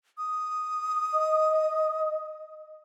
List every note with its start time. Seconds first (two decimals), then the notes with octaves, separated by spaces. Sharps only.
0.18 D#6
1.13 D#5